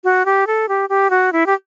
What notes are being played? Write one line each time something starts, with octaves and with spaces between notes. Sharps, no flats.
F#4
G4
A4
G4
G4
F#4
E4
G4